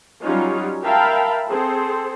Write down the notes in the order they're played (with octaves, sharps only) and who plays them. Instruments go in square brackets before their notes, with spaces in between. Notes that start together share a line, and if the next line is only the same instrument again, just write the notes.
[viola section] F#3 G3 C#4 D#4 F4
A#4 E5 F5 G5 A5 B5
C4 G#4 A4 C5